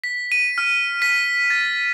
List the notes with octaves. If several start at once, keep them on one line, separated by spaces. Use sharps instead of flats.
B6
D#7
F6
B6
A6